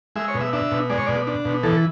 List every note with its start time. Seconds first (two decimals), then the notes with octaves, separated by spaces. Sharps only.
0.16 G#3 E5
0.28 C#5
0.34 B2
0.41 E5
0.53 D4 E5
0.71 B2
0.90 G#3 D5
0.98 C#5
1.06 B2 D5
1.27 D4
1.45 B2
1.63 E3 A4